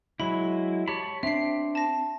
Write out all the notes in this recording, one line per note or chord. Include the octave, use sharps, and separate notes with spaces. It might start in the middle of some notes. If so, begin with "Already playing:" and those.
F#3 G#3 E4 B5
G4 C#5 A5 B5
C4 D4 E5 C7
A5 A#6